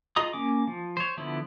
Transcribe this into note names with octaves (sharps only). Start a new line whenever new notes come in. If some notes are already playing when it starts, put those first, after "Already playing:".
F4 G#4 D#5 A#5 D#6
A#3 C#4 D6
F3
C5 C#5
D3 F3 B3 E4